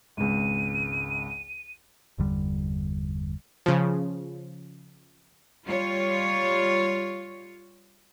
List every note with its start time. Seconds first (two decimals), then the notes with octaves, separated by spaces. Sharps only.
0.17 G#1 C#2 D#7
2.18 G1 E2 D3 G3
3.66 C#3 F3
5.65 G3 F4 C#5